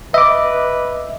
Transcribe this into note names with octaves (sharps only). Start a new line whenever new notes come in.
B4 D#5 E5 D6